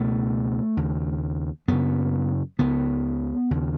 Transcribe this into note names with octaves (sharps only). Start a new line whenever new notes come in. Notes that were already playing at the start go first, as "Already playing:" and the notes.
Already playing: C#2 B2 A3
D#2 C#3
F#2 C#3 B3
C#2 C#3 B3
D#2 C#3